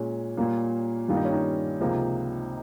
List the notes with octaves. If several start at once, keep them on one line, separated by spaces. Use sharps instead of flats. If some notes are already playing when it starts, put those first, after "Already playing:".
Already playing: A#2 G#3 C#4
A#2 G3 A#3
G2 D#3 G3 A#3 F4
D#4
C#4
D#4
C#2 C3 F3 A#3